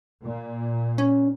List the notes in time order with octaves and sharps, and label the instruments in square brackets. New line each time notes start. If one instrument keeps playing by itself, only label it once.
[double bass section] A#2
[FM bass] C#4